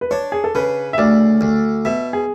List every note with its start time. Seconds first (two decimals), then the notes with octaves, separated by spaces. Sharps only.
0.01 B4
0.11 D4 C#5
0.32 G#4
0.44 A4
0.55 C#3 B4
0.93 E5
0.98 D2 D5
1.41 D2
1.85 B2 E5
2.13 G#4